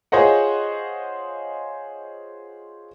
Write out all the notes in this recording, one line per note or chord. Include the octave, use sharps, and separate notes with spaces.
F4 G#4 C5 C#5 D#5 F#5